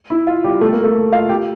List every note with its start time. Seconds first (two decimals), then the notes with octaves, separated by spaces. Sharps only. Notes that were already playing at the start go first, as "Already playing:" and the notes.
0.10 E4
0.27 F4
0.44 G3 G4
0.61 A3 A4
0.72 A#3 A#4
0.84 A3 A4
1.12 F4 F5
1.29 G4 G5